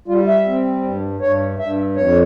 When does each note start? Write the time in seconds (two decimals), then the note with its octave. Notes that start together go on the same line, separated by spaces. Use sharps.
0.08 G3 F4
0.27 E5
0.46 C4
0.84 G2
1.20 G2 C#5
1.59 G2 E5
1.96 F2 C#5